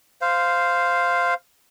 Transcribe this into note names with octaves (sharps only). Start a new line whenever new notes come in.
C5 F5